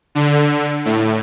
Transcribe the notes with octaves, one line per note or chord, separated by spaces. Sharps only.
D3
A2